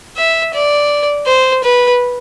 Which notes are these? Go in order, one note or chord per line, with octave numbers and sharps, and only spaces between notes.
E5
D5
C5
B4